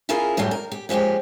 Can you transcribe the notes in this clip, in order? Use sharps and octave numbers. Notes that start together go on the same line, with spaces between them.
C#4 E4 F4 G#4 A#4
F#2 A2 C#3 F#3 G3
A#4
G4
A#2 F3 G#3 C#4 G4